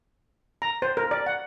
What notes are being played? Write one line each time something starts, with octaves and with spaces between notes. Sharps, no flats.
A#5
C5
A#4
D5
F#5